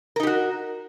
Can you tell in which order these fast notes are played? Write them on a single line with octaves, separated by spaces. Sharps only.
A#4 D#4 G4 F#4